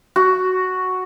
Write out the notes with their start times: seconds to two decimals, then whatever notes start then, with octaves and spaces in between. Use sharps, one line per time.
0.16 F#4